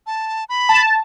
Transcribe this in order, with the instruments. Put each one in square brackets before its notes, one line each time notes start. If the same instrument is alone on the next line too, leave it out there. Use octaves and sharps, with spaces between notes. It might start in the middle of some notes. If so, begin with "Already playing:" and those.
[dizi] A5
B5
[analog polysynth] A5